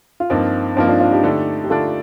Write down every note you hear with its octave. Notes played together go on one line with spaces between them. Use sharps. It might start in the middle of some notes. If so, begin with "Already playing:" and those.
F4
G2 F3 A#3 C4 D#4
G2 F3 A#3 C4 D#4
D4 F4
D4 F4
D#4 G4
D3 A3 D4
G4
D3 A3 D4 F4 A4